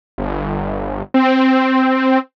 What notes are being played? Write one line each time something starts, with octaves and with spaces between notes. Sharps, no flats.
G1
C4